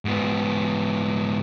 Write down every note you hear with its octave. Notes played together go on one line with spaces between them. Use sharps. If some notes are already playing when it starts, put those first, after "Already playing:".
G#2 B3